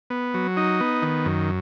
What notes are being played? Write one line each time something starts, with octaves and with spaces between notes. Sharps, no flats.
B3
F#3
D#4
B3
D#3
F#2